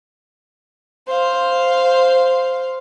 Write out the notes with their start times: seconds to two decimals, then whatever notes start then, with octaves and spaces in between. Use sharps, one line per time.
1.08 C5 F5